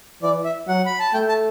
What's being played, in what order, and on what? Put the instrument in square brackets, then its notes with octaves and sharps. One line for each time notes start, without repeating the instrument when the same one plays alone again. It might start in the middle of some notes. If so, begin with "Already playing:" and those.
[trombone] E3 [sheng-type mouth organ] D5
[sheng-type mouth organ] E5
[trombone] F#3 [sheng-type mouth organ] F#5
[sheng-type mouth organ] B5
A5
[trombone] A3 [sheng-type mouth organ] G5
[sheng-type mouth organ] A5